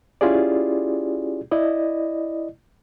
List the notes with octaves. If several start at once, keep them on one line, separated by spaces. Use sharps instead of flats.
C#4 E4 F4 G4 G#4 D5
E4 D5 D#5